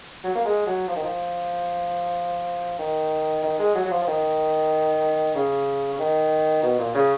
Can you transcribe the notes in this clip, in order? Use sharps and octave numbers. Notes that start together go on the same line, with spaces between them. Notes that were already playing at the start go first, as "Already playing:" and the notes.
F#3
A#3
G#3
F#3
F3
D#3
F3
D#3
D#3
G#3
F#3
F#3
F3
F3
D#3
C#3
C#3
D#3
B2
A#2
C#3